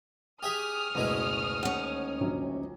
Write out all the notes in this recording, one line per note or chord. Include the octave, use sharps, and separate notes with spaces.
G4 G#4 E5 C#6 D#6 F6
F#1 D2 B2 G#3 E4
D#2 C#4 F#5
A#1 D3 F#3